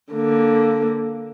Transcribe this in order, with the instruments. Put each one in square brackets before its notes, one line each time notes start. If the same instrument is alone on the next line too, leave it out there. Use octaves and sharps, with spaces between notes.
[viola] D3 A#3